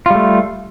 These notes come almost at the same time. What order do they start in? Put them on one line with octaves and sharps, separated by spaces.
F4 G3 A3